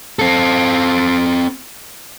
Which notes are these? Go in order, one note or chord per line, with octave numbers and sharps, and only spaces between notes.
C4 A4